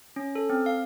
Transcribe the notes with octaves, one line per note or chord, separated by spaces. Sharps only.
C#4
A4
C4
F5